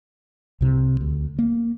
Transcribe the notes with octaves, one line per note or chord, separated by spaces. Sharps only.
C2 C3
D2
A#3